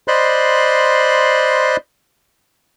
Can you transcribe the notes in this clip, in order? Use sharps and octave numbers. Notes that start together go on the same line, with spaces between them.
C5 D5 D#5 B5 C6 F#6